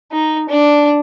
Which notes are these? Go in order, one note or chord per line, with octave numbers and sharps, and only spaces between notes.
D#4
D4